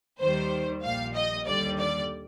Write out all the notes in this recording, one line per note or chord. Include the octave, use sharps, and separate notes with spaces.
D#2 D#3 G3 C5
A#1 A#2 G3 F5
D#5
D#2 D3 G3 D5
D5